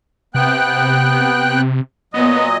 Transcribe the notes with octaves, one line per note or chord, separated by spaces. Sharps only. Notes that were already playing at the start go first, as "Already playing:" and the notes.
C3 B3 G5 F#6
A#2 F#3 B3 D#5